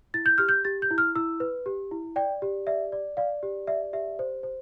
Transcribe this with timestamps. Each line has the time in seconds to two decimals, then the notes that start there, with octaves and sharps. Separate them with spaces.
0.14 E4 A6
0.26 G6
0.38 G4 F6
0.49 G6
0.65 G4 A6
0.82 G6
0.91 E4
0.98 F6
1.15 E4 E6
1.40 B4
1.66 G4
1.91 E4
2.16 D5 G5
2.42 G4
2.67 D5 E5
2.92 D5
3.17 D5 F5
3.43 G4
3.67 D5 E5
3.93 G4 E5
4.19 C5
4.43 C5